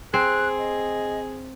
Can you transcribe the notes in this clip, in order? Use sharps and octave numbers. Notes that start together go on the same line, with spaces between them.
C4 G#4 F#6
D#5